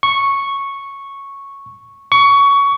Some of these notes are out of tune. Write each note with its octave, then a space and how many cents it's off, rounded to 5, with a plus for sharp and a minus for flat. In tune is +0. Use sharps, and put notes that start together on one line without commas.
C#6 -5
C#6 +20